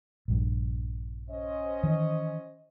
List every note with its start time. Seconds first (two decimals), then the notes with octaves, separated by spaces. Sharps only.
0.28 A#1 G2
1.30 C#4 C5 D#5
1.83 D#3 E3